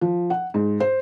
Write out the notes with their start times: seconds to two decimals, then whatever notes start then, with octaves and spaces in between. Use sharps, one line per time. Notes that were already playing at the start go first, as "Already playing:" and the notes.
0.01 F3
0.30 F#5
0.54 G#2
0.80 C5